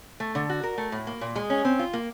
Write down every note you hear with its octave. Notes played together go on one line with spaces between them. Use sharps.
A3
D3
F#4
A#4
A3
A2
A#3
A#2
G#3
C#4
C4
F4
A#3